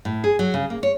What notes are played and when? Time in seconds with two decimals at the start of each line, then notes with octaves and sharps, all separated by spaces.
0.05 A2
0.24 G#4
0.39 F#3
0.54 C#3
0.70 A#3
0.83 C#5